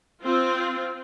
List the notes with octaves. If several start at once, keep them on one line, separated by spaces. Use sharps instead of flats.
C4 F4